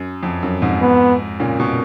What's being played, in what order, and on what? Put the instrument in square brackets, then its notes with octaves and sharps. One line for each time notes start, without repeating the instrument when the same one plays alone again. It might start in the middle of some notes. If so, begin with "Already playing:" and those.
Already playing: [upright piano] F#2
F2
F#2
F2 G#2
[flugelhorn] B3
[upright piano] A#2 C#3
B2